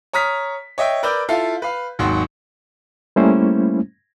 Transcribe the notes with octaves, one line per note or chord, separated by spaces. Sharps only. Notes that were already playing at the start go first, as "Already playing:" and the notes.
C#5 A#5 D#6 F6 B6
C#5 D#5 E5 G5
A#4 B4 D5 D6 E6 G6
E4 F4 A4 F5
B4 F5
G#1 D#2 F#3 F#4 C6 C#6
G3 A3 A#3 C#4 E4 C5